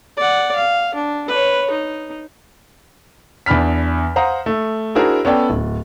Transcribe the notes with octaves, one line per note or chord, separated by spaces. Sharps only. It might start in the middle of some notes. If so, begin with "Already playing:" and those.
D5 F#5
F5
D4
B4 C#5
D#4
E2 D4 B5 F6 B6
C5 F5 F#5 A#5 D#6
A3
D4 E4 F#4 G#4 A#4 C5
B3 C#4 A4 D5 G5
D1